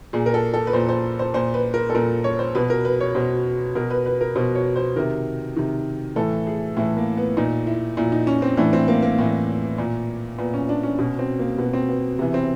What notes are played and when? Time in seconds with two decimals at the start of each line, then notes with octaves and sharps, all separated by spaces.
0.13 A#2 G#4
0.26 A#4
0.34 A4
0.54 A4
0.67 B4
0.73 A#2 C5
0.89 C5
1.19 C5
1.34 A#2 C5
1.54 B4
1.74 A#4
1.90 A4
1.95 A#2 A#4
2.24 C#5
2.39 C5
2.55 B2 B4
2.70 A#4
2.85 B4
3.00 C#5
3.15 B2 C5
3.75 B2 A#4
3.90 B4
4.06 B4
4.21 A#4
4.36 B2 C5
4.55 C#5
4.76 C5
4.96 C3 D#3 A#4
5.56 C3 D#3
6.16 A2 E3 A4
6.47 G#4
6.77 A2 E3 E4
6.97 A#3
7.17 B3
7.37 A#2 D#4
7.67 E4
7.97 A#2 E4
8.12 D#4
8.27 C#4
8.42 C4
8.57 A2 E3 D4
8.73 C4
8.88 A#3
9.02 A#3
9.18 A2 E3
9.78 A#2
10.38 A#2 B3
10.54 C#4
10.69 D4
10.83 C#4
10.99 B2 C#4
11.19 C4
11.39 A#3
11.58 B2 B3
11.74 C4
11.89 B3
12.19 C3 E3 B3
12.34 C4